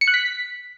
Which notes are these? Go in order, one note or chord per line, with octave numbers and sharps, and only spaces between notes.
C#7
F#6
B6